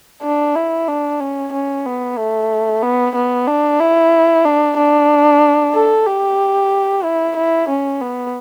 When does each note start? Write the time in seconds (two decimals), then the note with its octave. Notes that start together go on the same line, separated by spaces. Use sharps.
0.23 D4
0.55 E4
0.88 D4
1.20 C#4
1.53 C#4
1.86 B3
2.18 A3
2.83 B3
3.15 B3
3.47 D4
3.80 E4
4.45 D4
4.77 D4
5.74 A4
6.07 G4
7.04 E4
7.37 E4
7.69 C#4
8.01 B3